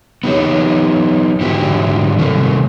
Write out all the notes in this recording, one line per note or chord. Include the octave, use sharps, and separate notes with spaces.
B3 D#4 G4 C#5
G#2 D3 E4 F#4 G4
C3 D#3 A3